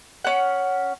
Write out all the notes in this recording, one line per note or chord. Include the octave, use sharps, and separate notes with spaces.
C#4 F#5